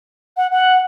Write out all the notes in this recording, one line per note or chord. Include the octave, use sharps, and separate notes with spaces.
F#5
F#5